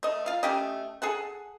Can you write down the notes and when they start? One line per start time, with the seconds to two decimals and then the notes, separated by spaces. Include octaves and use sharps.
0.03 A3 D#5
0.26 F4 F5
0.43 A3 C#4 G4 D#5
1.02 G#4 A4 F#5